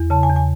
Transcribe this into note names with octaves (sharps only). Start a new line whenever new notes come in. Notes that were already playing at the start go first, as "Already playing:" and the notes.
Already playing: E2
C#3 A5
G#5
E2
G#5